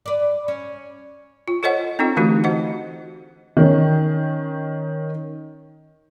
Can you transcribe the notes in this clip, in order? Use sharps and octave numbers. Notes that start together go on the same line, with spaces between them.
B4 D5
C#4
F4
F4 A4 C5 C#5 D#5 F#5
C4 D4 D#4 F4 A4
D3 E3 A3 D#4 F#4 G4
F#4 C5 D#5 F#5
D#3 C#4